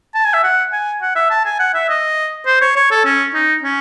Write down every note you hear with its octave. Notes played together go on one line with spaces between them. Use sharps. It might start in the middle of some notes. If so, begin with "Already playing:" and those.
A5
G#5
E5
F#5
G#5
F#5
E5
A5
G#5
F#5
E5
D#5
C5
C#5
C#5
A4
C#4
D#4
C#4